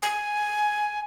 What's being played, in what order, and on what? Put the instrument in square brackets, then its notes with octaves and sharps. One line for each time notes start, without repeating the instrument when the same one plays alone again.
[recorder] G#5